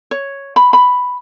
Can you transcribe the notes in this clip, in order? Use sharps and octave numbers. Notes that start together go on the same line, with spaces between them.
C#5
B5
B5